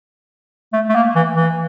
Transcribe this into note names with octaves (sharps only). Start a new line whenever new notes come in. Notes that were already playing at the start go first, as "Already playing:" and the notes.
A3
A3
A#3
E3
E3